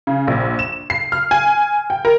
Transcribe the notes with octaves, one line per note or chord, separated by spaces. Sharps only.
C#3
A#1
E7
C7
F6
G#5
G5
A#4